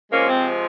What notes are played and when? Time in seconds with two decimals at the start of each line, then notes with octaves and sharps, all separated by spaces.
0.12 C3 F3 G#3 A#3 C#4
0.28 C4